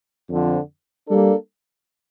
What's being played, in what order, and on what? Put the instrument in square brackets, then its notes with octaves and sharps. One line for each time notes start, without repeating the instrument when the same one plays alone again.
[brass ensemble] F2 D3 F3 C4
G3 A#3 D4 A4